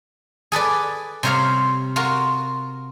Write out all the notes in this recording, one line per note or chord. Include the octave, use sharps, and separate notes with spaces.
G#4 A4 B4 D5
C3 G3 C5 C#5 F5 A#5
F4 F#4 A#4